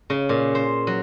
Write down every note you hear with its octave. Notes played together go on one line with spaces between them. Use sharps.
C#3
A#2
C5
F#3